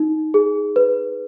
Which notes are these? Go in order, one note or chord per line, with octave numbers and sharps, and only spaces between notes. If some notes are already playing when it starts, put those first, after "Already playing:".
Already playing: D#4
G#4
B4